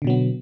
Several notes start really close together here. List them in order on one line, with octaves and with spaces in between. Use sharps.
D3 B2 F#3 B3